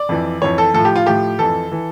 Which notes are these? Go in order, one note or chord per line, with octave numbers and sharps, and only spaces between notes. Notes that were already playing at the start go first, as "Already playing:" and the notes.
Already playing: D5
F2 E3
F2 E3 C#5
A4
A2 F3 A4
G4
F4
A2 F3 G4
F2 E3 A4
E3